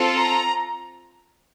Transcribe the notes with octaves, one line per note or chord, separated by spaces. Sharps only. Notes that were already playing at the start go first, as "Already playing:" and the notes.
Already playing: C4 F4 A4
A#5